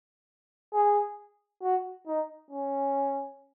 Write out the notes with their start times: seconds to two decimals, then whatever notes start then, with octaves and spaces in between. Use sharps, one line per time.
0.75 G#4
1.63 F#4
2.07 D#4
2.51 C#4